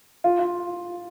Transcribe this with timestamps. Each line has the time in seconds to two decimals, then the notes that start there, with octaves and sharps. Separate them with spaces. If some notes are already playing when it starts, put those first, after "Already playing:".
0.24 F4
0.39 F4